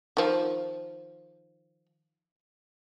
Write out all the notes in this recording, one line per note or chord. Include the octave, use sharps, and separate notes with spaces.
D#3 F3